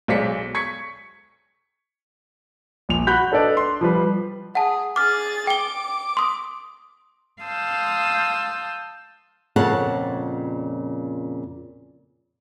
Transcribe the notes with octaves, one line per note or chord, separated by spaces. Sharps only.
B1 G#3 C5 D5 B6 C#7
C#6 G#6 B6 C#7
A#1 F7
F#4 B5 F#6 G6 B6
D4 A4 B4 D5 D#5
C6
F3 G3 B4
G#4 F#5 A5
G#4 D6 F6 A6
G5 D6 G7
C6 D#6
F5 A5 C6 D#6 E6 G6
F2 A#2 C#3 C#5 F#5 A5